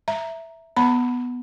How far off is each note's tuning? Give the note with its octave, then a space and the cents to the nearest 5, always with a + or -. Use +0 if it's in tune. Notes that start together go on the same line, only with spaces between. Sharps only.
E5 +0 A#5 +0
B3 +0 F#5 +0 B5 +0